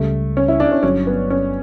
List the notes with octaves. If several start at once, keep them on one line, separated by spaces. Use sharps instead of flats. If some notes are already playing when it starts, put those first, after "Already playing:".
Already playing: C#2 C#3 G3 A3
C#4
E4
D4
C#4
G1 G2 F#3 C#4
B3
C#4